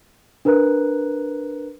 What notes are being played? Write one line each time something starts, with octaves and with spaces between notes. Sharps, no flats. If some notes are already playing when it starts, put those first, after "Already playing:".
D4 A#4 B4 A#5 F#6